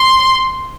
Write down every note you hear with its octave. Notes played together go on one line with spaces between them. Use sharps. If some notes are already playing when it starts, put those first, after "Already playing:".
Already playing: C6